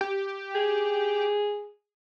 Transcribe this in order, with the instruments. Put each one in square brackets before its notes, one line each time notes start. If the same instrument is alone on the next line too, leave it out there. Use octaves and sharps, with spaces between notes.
[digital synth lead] G4
[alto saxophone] G#4